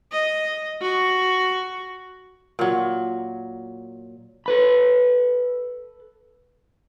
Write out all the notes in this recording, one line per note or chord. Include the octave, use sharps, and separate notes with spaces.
D#5
F#4
A#2 F#3
A4 B4 B5